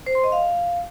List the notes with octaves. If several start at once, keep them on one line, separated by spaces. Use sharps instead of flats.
C5
C6
D#5
F5